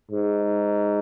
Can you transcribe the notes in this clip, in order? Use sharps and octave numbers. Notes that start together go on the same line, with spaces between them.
G#2